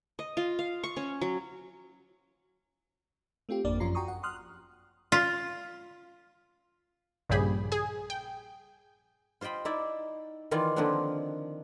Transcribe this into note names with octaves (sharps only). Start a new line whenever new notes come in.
D#5
F4
F5
C#6
C#4
F#3
A3 C4 F4 G4
G#1 F2 A#3 D4 D5 D6
F#2 F3 C#4 F4 A#5 C7
F#4 G5 G#5 A#5 C#6 D#6
F#5
C6 D#6 F6 F#6
F4
A#1 G2 C#3 G4 G#4 B5
G#4 G#5
G5
F4 C5 D#5 G5 B5
D#4 E4 D5 E5
D#3 E3 F4 D5
D3 D#3 F3 A#3 C4 D4